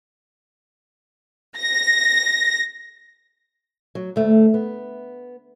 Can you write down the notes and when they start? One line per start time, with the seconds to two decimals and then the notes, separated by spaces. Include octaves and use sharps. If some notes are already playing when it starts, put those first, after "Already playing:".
1.58 A#6
3.95 F#3
4.16 D2 A3
4.54 B3